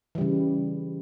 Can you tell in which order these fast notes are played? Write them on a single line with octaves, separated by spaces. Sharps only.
E3 G3 C#3